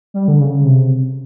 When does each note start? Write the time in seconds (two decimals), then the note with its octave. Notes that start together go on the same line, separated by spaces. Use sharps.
0.14 G3
0.28 D3
0.40 C#3
0.64 C3